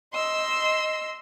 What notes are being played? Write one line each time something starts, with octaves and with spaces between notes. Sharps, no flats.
D#5 C6 E6